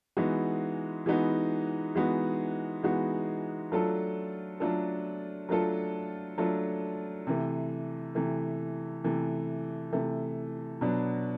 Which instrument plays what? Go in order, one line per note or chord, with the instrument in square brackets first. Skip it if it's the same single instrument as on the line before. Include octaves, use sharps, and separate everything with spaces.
[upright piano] E3 G#3 B3 D#4 F#4
E3 G#3 B3 D#4 F#4
E3 G#3 B3 D#4 F#4
E3 G#3 B3 D#4 F#4
F#3 A3 D4 F4 A4
F#3 A3 D4 F4 A4
F#3 A3 D4 F4 A4
F#3 A3 D4 F4 A4
C3 E3 A3
C3 E3 A3
C3 E3 A3
C3 E3 A3
B2 F#3 B3 D4